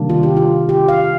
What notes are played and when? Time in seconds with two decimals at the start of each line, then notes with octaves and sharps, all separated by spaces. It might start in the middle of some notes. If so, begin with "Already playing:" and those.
Already playing: C3 D#3 G3 A#3 D4
0.09 F4
0.23 G4
0.37 F4
0.69 G4
0.88 F5